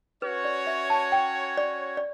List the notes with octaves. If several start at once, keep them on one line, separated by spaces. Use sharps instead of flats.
C#4 F#4 B4 C#5
D5
E5
A5
G5
D5
D5